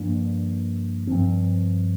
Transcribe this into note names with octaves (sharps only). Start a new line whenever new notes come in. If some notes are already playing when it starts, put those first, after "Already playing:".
Already playing: G2 F3 A#3 D4
G2 F3 C4